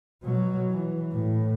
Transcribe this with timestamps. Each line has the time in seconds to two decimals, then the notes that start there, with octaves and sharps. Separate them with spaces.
0.23 B2 F#3
0.70 E3
1.12 A2